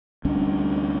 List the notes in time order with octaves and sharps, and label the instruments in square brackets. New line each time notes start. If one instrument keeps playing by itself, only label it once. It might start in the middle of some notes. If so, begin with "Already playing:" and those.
[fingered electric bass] D2 G3 C#4 D4